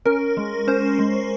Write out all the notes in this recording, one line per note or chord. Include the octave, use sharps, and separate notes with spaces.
C#4 A#4
G#3
C#4 C5
G#3